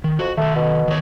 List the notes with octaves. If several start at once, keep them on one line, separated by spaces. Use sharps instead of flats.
D#3
F2 F#4
D#3 A3 A4
B2
D#3 C#5